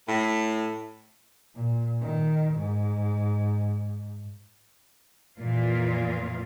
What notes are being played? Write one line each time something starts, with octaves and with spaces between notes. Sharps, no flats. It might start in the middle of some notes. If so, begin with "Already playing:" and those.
A2
A#2
D#3
G#2
F2 A#2 E3 F4